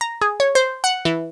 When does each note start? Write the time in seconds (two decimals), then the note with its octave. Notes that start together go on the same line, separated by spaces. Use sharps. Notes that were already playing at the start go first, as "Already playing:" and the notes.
0.01 A#5
0.22 G#4
0.40 C#5
0.55 C5
0.84 F#5
1.05 E3